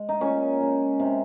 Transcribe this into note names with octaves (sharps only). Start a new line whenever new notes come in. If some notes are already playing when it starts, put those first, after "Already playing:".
Already playing: G#3
D#4
A#2 C#4
G#3 C#4
C3